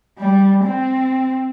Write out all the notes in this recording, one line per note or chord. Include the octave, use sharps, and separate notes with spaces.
G3
C4